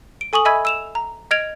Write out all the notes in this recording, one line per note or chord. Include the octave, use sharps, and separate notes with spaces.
D7
A4 G#5 C#6 D#6 F#7
D#5 E5 G#5 B5 E6 G#6
E6 E7 F7
A#5
D#5 F6 G#6 D7 F7